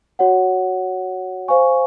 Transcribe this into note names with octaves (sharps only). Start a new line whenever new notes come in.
F#4 C#5 F#5
C5 F5 G#5 C#6